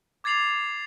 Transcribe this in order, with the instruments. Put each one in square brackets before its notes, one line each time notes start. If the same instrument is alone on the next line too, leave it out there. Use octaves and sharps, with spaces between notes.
[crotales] D6 G#6 A6 C7 F7 F#7